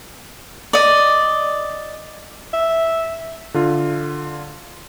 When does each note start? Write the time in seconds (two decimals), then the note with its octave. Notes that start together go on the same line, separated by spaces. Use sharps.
0.73 D5 D#5
2.53 E5
3.54 D3 F4